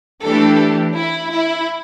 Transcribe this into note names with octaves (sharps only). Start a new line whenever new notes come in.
E3 A3 D4 G4 A4
E4
E4